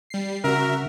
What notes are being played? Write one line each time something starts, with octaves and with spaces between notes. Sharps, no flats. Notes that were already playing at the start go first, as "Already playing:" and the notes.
G3 C7
C#3 F#4 A#4 E5